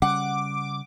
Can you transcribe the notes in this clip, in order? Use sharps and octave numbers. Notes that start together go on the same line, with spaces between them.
C#3 G3 C#4 F#5 D6